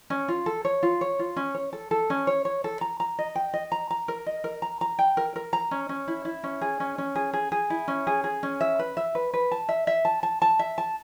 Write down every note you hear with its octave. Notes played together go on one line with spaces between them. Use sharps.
C#4
F4
A4
C#5
F4
C#5
F4
C#4
C#5
A4
A4
C#4
C#5
C#5
A4
A#5
A#5
D#5
G5
D#5
A#5
A#5
A#4
D#5
A#4
A#5
A#5
G5
A#4
A#4
A#5
C#4
C#4
E4
E4
C#4
G#4
C#4
C#4
G#4
G#4
G#4
E4
C#4
G#4
G#4
C#4
E5
B4
E5
B4
B4
A5
E5
E5
A5
A5
A5
E5
A5